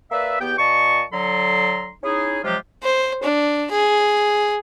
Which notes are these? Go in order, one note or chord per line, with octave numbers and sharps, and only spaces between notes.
A#3 B4 D5 E5
E2 B3 G4 G5
A#2 D#5 A5 C#6
D3 F#3 A4 A#5 C6
C#4 D#4 E4 G#4
C3 F3 F#3 G#3 F4 G4
C5
D4
G#4